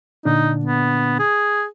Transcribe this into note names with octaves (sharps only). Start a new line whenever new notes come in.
A#2 D3 D4 D#4
B3
G#4